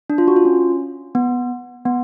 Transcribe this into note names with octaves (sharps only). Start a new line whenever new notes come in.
D4
F4
F#4
F4
C#4
B3
B3